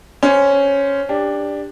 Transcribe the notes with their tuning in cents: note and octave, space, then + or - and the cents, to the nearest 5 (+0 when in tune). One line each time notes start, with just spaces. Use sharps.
C#4 +0 C5 -10
D4 +0 G4 +25